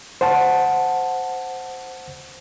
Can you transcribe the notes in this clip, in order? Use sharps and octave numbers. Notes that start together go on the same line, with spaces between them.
C5 F#5 A5